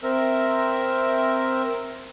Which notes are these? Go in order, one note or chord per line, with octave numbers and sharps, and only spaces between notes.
C4 A#4 E5